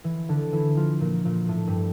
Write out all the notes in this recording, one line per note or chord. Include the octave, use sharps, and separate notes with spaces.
E3
D3 D4
E3 E4
F3 F4
A#2 A#3
A#2 A#3
A2 A3
G2 G3